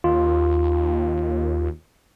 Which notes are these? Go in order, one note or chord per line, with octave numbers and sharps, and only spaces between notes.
D#2 F4